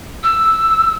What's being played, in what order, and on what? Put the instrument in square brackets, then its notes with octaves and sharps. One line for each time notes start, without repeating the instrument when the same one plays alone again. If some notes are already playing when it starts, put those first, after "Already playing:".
[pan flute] E6